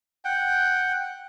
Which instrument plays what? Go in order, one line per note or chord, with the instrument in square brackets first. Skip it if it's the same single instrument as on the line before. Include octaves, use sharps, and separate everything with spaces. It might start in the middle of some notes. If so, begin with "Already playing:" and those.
[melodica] F#5 G5